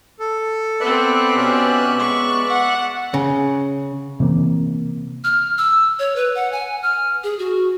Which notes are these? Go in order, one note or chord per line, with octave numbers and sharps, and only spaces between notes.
A4
B3 C4 B4 D5 E5 F#6
B2 C#4 G4
G#3 C#6
F#5
C#3
C3 E3 A#3
F6
E6
C#5
B4
F#5
G#5
F6
G#4
F#4